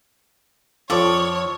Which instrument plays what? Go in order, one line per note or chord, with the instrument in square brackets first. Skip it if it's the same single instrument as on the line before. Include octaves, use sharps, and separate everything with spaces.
[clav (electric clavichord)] F2 F3 [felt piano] F4 [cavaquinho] A4 D5 D6 [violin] C#5